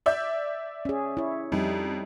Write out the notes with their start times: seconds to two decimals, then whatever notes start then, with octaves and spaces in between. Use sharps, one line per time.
0.06 D5 E5 G6
0.85 C#4 G#4
1.17 E4 C#5
1.52 F2 G3 D#4